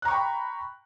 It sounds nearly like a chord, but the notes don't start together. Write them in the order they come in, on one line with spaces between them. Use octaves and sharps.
F#6 A#5 C#6 G5 B5